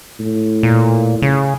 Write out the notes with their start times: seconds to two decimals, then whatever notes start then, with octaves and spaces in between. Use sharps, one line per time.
0.20 A2
0.63 A#2
1.22 C#3